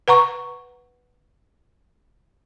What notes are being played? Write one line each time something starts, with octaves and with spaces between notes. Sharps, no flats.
B4 F#5 A#5 C#6